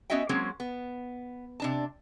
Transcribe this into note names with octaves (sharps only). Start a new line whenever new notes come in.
B3 C#4 F#4 D#5 E5 G5
F#3 G#3 A#3 C4 C#4
B3
C3 D4 A5